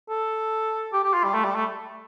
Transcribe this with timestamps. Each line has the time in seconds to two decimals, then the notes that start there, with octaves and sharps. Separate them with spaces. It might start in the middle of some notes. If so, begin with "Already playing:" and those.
0.10 A4
0.93 G4
1.04 G4
1.14 F4
1.24 G3
1.34 A3
1.45 G3
1.55 A3